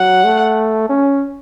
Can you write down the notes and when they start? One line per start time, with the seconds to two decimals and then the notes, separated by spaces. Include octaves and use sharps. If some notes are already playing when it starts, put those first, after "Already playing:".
Already playing: F#3 F#5
0.24 A3
0.89 C#4